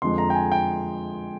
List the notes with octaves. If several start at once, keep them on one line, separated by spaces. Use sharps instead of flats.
F2 D3 F3 G#3 C6
A#5
G5
G#5
G5